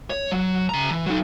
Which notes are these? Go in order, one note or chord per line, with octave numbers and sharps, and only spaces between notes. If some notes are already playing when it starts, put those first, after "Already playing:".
C#5
F#3
C#3 A#5
E3
F#3 D#4